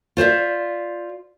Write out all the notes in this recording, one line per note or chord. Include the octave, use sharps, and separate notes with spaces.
F4 C5 D5 E5